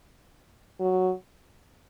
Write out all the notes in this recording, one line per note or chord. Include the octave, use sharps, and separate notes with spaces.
F#3